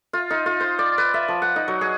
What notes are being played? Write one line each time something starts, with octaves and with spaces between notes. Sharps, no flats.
F4
D#4
F4
C5
D5
B4
E5
F3
F#5
D#4
F#3
G#4